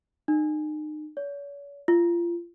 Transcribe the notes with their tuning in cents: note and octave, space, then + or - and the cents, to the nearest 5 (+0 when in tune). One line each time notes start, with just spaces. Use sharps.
D#4 -35
C#5 +40
F4 -30